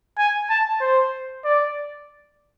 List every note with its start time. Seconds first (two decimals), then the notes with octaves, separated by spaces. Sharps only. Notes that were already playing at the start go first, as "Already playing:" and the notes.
0.18 G#5
0.50 A5
0.81 C5
1.44 D5